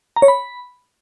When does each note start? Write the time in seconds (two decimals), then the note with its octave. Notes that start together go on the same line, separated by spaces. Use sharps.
0.16 A#5
0.22 C#5
0.28 B5